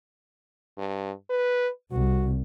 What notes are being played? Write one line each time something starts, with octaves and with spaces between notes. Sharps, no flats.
G2
B4
C2 F#4